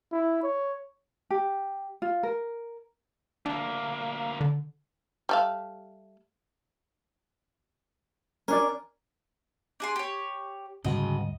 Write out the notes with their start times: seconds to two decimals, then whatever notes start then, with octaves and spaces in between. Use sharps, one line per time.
0.12 E4
0.43 C#5
1.31 G4
2.02 F4
2.23 A#4
3.46 D2 A#3 D4
4.41 D3
5.29 G3 A3 F5
8.48 C#4 D4 A#4 D5
9.80 D4 G#4 C6
9.96 G4 C#5
10.85 D2 G#2 C#3 G3 F#4 D#5